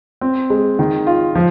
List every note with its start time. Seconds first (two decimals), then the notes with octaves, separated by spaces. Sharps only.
0.21 C4
0.50 G#3
0.79 D#3
1.07 F4
1.35 F3